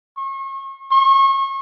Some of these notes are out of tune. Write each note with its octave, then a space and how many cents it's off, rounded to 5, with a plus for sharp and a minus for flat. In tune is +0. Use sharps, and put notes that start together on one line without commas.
C#6 -40
C#6 -30